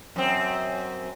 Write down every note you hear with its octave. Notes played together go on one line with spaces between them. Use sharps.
F#2 C4